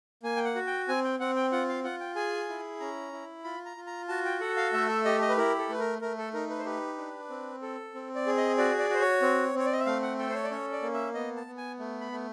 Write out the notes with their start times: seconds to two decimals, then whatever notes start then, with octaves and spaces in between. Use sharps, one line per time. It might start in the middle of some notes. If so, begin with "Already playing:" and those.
0.23 A#3 G#5
0.36 G5
0.45 F#5
0.55 F#4
0.67 G5
0.88 C4 G#5
1.04 G5
1.19 C4 F#5
1.36 G5
1.52 F4 F#5
1.69 F5
1.84 F4 F#5
2.00 G5
2.16 G#4 G#5
2.49 E4
2.80 C#4 A#5
3.12 E4
3.44 F4 B5
3.66 A#5
3.77 F4
3.87 A#5
4.09 F#4 A5
4.25 G5
4.40 A4 F#5
4.57 F5
4.73 A3 E5
4.89 E5
5.05 G4 D#5
5.22 D#5
5.29 B4
5.37 E4 A#4
5.58 A4
5.69 A3 B4
5.80 A#4
6.01 A3 A#4
6.18 A4
6.33 D#4 A#4
6.50 B4
6.59 C5
6.65 G4 B4
6.98 D4
7.30 C4
7.62 A4
7.94 C4
8.15 D5
8.27 G#4
8.37 D#5
8.58 F#4 D5
8.79 D5
8.90 F#4 C5
9.01 C#5
9.22 C4
9.55 C4 C#5
9.66 D5
9.73 D#5
9.79 E5
9.86 A3 F5
10.02 F#5
10.18 A4 G5
10.30 C5
10.35 C#5
10.44 D5
10.51 C#4 C#5
10.72 D5
10.82 A#3
10.94 E5
11.14 B3 D#5
11.36 A5
11.47 B3
11.57 G#5
11.79 A3
12.01 B5
12.12 A3